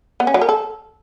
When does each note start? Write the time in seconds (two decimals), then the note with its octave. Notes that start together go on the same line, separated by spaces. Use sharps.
0.20 B3
0.27 C#4
0.34 F#3
0.41 A#4
0.49 A4